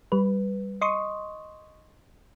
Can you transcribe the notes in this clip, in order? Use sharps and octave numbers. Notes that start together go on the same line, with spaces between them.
G3 B4
D#5 C6 C#6 D#6